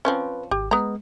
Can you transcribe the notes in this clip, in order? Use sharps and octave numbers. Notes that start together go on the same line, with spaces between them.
F3 C4 C#4 B4
G#1 G4
G#3 B3 A#5